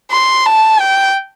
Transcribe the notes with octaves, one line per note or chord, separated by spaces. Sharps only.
C6
A5
G5